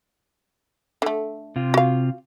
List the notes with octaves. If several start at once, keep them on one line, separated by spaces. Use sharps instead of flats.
D3 A3
C3 F4
F#4 F5